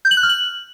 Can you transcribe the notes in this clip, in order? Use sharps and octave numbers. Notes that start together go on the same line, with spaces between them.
G6
F#7
F#6
F6
F#7